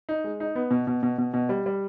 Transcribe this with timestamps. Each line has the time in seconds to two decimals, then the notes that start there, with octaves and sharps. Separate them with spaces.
0.09 D#4
0.24 G#3
0.40 D#4
0.55 B3
0.71 B2
0.87 B2
1.03 B2
1.18 B2
1.34 B2
1.49 G3
1.66 G3